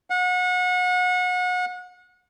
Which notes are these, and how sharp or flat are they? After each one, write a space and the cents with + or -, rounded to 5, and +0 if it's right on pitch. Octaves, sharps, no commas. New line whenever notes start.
F#5 -30